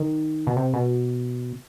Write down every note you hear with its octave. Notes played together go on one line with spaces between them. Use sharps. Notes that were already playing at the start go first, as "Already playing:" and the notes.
Already playing: D#3
B2
C3
B2